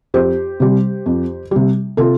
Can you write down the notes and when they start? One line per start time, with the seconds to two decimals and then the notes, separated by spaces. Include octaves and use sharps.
0.14 F2 G4 C5
0.60 C3 G3
1.06 F2
1.51 C3 G3
1.97 C3 F4 A4